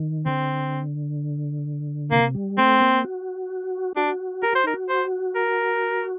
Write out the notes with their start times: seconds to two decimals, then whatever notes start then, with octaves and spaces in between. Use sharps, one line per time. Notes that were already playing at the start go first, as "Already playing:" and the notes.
Already playing: D#3
0.26 D3 C4
2.11 C3 A#3
2.35 G3
2.58 A3 C4
2.80 A#3
3.04 F#4
3.96 D4 F#4
4.42 G4 A#4
4.53 F#4 C5
4.64 D#4 A#4
4.73 F#4
4.89 C5
5.35 A#4